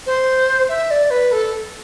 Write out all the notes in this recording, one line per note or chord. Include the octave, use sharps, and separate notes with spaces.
C5
E5
D5
B4
A4